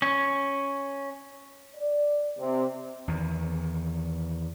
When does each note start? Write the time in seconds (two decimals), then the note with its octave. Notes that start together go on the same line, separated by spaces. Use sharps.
0.02 C#4
1.75 D5
2.39 C3
3.08 E2 D#3